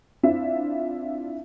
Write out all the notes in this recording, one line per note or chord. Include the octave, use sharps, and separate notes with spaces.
C4 D4 E4 F4 E5